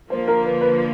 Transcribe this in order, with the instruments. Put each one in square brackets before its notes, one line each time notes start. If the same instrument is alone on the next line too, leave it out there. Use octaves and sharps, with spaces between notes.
[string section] D3 F3 A#3 [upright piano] C5
[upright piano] A#4
B4
B4